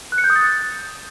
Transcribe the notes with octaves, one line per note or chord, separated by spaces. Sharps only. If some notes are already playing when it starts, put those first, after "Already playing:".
F#6
C#7
G6
D#6
A6